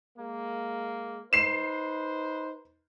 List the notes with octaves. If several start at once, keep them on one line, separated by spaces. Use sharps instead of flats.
G#3 A#3
D#4 B4 C5 C7 E7